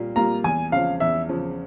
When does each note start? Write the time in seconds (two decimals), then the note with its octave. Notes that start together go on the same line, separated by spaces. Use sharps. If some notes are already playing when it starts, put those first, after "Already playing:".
Already playing: A#2 G3 A#3
0.16 G3 A#3 F4 A#5
0.44 E2 G#5
0.72 C#3 F3 F5
1.00 E2 E5
1.29 C#3 F3